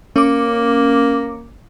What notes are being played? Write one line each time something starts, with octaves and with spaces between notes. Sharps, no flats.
A#3 C#4 D6